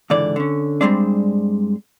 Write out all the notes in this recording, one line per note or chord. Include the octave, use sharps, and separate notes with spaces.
C#2 G#2 D3 E3 D5
D3 C#4
G2 G3 G#3 C4 D4